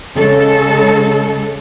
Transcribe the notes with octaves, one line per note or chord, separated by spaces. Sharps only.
C#3 G#3 A4